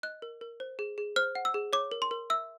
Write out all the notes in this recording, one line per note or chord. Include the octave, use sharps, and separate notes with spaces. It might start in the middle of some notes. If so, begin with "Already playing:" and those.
D#5 F#6
A#4
A#4
C5
G#4
G#4
C5 F6
F#5
E6
G#4
C#5 D6
A#4
C6
A#4
E5 E6